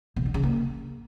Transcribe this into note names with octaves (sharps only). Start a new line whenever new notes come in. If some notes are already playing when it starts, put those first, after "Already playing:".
B2
D3
C#3
A#3